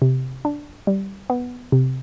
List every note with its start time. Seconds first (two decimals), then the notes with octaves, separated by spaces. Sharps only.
0.02 C3
0.45 D4
0.87 G3
1.30 B3
1.72 C3